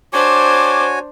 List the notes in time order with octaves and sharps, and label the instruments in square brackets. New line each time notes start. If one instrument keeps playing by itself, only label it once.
[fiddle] D4 C5 [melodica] F#4 C#5 G#5 [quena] D6